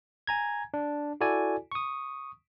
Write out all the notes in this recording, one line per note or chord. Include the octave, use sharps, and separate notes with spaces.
G#5 A#5 G#6
D4
E4 F#4 A4 D5 G#5
C#6 D#6